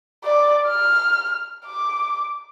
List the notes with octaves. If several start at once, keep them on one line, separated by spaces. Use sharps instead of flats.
D5
F6
D6